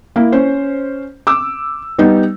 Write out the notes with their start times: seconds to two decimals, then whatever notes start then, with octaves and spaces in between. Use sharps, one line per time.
0.16 A#3 E4
0.32 C#4 C5
1.27 D6 E6
1.99 G3 B3 D#4